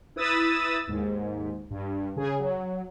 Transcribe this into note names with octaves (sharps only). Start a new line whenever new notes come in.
E4 B4 D#6 E6 A6
D#2 G#2
G2
C#3 G#4
F#3